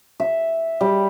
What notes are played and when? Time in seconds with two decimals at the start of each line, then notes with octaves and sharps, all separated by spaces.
0.20 E5
0.81 G3